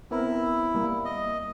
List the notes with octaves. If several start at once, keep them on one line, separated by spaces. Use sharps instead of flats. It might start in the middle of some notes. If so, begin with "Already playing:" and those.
B3 C4 E4 A#4
G3 A#3
D#5